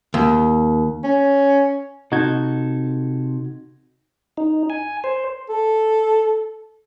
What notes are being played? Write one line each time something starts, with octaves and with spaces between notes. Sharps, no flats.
D#2
C#4
C3 D#4 F#4 A4 G#6
D#4
G#5
C5
A4